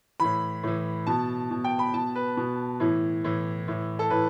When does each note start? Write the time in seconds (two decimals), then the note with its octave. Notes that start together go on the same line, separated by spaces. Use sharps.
0.20 A2 E3 B5
0.63 A2 E3
1.07 B2 A5
1.51 B2
1.64 G5
1.79 B5
1.94 B2 A5
2.15 B4
2.37 B2
2.80 A2 E3
3.25 A2 E3
3.68 A2 E3
3.99 A4
4.10 A2 E3 B4